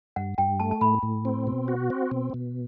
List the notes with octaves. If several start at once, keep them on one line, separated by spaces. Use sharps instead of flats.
G2 F#5
G2 G5
A3 A5
A5
A2 B5
A2
C4
B2
F#4
C4
B2
B2